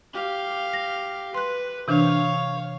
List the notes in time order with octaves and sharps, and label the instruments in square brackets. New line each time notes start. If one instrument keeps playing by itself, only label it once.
[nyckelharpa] G4 F5
[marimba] A#6
[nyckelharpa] B4 [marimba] C6 F#6
[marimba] C3 E3 D4 [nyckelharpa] C#5 F5